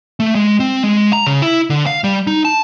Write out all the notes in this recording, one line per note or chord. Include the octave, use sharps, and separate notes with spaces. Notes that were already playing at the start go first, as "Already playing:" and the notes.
A3
G#3
C4
G#3
A#5
C#3
E4
D3
F5
G3
D#4
A5